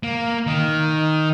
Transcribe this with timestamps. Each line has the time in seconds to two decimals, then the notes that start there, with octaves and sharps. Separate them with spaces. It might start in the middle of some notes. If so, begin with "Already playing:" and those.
0.03 A#3
0.47 D#3